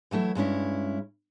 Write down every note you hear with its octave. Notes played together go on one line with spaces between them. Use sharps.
E3 F#3 A3 E4
G2 G#3 C#4 E4